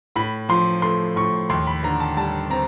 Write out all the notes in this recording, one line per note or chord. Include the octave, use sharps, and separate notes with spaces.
A2 B5
F3 C6
A3 C6
A2 C#6
D#2 C6
B5
D3 A#5
A5
G3 A5
C4 A#5